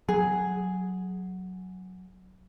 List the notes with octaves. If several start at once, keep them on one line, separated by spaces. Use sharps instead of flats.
F#3 G#4